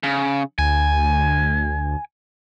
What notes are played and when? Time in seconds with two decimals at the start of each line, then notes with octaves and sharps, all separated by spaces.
0.03 C#3
0.59 D2 G#5